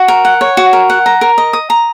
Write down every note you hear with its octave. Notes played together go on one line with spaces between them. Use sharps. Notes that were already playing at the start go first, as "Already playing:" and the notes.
Already playing: F#4
A#4
F#5
C#5
F#4
A#4
F#5
A#5
A#4
D#5
D#6
A#5